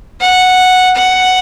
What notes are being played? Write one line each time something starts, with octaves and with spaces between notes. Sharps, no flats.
F#5
F#5